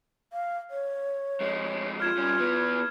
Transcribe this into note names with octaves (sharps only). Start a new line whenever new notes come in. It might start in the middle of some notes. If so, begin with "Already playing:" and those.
F5
C#5
F2 G#3
F4 F6 G#6 E7
G2 C#4
E3 B3